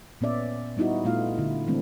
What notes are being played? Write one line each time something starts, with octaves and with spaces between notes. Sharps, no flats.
A#2 B3 C#4 D5 E5
G3 B3 D#4 E4 F#4
A#2 A3 B3 E4 F4 F5
D3 E4
D#3 E3 G#3 A3 C4 D4